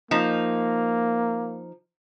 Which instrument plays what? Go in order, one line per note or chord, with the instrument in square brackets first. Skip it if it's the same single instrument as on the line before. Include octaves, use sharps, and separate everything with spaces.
[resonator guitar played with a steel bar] F3 D#4 [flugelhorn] A#3